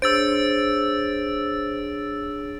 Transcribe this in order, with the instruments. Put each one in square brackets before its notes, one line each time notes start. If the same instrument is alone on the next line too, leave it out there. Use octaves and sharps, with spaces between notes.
[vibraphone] D4 G#4 C#5 [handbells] C5 [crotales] E6 A6 D7